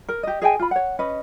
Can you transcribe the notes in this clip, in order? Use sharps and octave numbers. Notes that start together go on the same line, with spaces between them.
A#4
G4 D#5
G#4 D#5 G5 G#5
F4 B5
C#5 F#5
C#4 B4 D#5